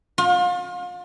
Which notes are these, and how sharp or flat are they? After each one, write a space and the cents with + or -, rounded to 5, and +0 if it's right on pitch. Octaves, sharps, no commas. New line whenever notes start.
F4 +35